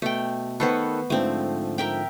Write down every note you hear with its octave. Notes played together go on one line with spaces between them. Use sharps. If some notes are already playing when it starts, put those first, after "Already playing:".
B2 A3 G5
D#3 B3 A4 B4 C5 C#6
G#2 D3 F3 A3 C4
A#4 E5 G5